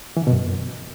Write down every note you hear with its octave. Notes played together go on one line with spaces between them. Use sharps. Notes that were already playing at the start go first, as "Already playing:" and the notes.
E3
D3
B2
F#2